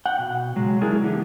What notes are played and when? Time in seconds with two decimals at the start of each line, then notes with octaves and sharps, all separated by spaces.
0.06 F#5 G5
0.19 B2
0.56 C#3 F#3 G#3
0.81 F#3 D4 E4 G#4 A#4
1.04 D3 E3 B3 G4